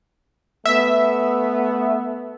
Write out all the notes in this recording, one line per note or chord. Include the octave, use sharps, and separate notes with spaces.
A3 B3 E5